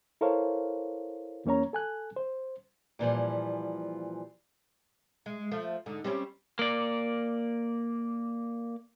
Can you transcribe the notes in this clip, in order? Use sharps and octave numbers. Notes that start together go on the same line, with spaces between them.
E4 A4 A#4 C5 C#5 F5
E2 A#3 C#4 C#5 A#5
A4 G#5 F#6
C5
A#2 E3 F3 G3
G#3
F3 A3
G#2 D3
G3 C4 C#4
A#3 D5